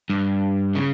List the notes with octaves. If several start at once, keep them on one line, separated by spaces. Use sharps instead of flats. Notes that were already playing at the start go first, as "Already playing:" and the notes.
G2
C#3